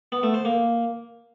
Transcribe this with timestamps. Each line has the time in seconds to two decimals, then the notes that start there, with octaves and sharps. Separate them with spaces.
0.12 B3
0.23 A3
0.34 C5
0.45 A#3